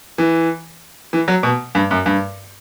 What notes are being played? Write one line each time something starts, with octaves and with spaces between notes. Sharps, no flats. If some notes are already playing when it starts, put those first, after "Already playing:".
E3
E3
F#3
B2
G2
F#2
G2